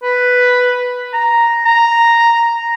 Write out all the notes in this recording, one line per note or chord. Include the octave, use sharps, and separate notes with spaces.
B4
A#5
A#5